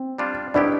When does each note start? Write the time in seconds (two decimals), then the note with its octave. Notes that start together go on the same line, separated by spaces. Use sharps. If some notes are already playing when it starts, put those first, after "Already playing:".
Already playing: C4
0.18 G3 D4 F4
0.54 C2 B2 B3 D4 E4 G4